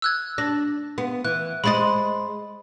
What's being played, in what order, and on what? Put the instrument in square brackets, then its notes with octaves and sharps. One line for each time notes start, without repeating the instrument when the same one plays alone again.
[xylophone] E6 F#6 G#6
[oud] D4 [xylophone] A#6
[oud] B3
[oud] E3 [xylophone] F#6
[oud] G#3 C5 D#5 [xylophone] B5 A6